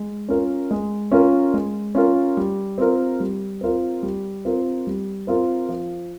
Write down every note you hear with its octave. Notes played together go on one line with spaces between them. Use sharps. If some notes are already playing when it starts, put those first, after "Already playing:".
Already playing: G#3
C#4 F4 A#4
G#3
C#4 F4 A#4
G#3
C#4 F4 A#4
G3
C4 F4 A#4
G3
C4 F4 A#4
G3
C4 F4 A#4
G3
C4 F4 A#4
F3